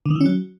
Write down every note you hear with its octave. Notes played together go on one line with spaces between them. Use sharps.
D3
D#3
E3
C#4
F#3